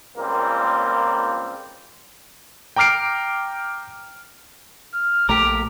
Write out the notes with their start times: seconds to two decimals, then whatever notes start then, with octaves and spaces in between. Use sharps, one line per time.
0.17 C#2 A#2 G3 A#3 C4
2.76 G5 A#5 D6 F6 C7 D7
4.94 F6
5.29 A#1 A3 G4 A#4 D6